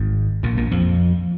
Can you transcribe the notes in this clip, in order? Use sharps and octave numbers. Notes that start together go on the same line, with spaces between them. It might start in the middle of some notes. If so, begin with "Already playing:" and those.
Already playing: G#1 G#2
A#1 A#2
A#1 A#2
F2 F3